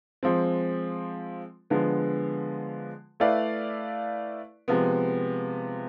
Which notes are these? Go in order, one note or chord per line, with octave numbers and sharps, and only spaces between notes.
F3 G#3 C4
D3 F3 G#3 B3
A3 E4 B4 D5 F5
C3 F3 G#3 B3